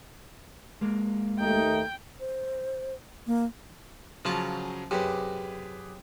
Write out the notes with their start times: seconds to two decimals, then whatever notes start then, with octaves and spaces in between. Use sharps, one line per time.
0.81 G#3 A#3
1.40 D#2 A3 D#4 G5
2.20 C5
3.27 A#3
4.25 C#3 F3 F#3 C#4 F4 A5
4.91 F#2 C3 G4 G#4 B4